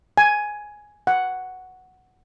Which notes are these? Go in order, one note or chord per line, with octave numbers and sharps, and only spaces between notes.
G#5
F#5